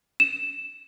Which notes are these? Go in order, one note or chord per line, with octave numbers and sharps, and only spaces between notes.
E7